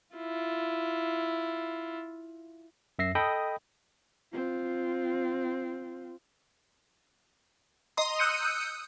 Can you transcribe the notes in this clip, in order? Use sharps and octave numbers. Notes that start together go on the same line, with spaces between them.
E4 F4
F#2 E5 A#6 C7
A4 D#5 G5 B5 D#6
C4 F4
D#5 A#5 C6 D#6
D#6 E6 F#6 G6 C#7 D#7